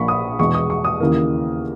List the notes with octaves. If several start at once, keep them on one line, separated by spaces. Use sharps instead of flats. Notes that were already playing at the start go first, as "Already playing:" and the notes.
Already playing: A#1 A#2 A#3 B5 C#6
D#6
E2 B2 G#3 C#6
D#6
C#6
D#6
D#2 C#3 E3 A#3